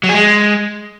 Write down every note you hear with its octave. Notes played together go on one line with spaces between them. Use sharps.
F#3
G#4
G#3